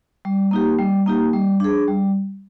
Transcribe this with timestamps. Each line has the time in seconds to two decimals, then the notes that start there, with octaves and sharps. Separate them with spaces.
0.25 G3
0.51 A#3 D#4 G4
0.78 G3
1.06 A#3 D#4 G4
1.33 G3
1.60 D4 G#4
1.88 G3